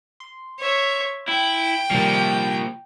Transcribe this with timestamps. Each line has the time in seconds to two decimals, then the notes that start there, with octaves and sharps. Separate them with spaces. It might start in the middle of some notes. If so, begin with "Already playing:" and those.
0.20 C6
0.59 C#5 E5
1.29 E4 G5
1.91 C3 D#3 F3 G3 A#3